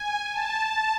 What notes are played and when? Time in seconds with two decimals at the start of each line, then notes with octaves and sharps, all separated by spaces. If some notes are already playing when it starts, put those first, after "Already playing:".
Already playing: G#5
0.31 A5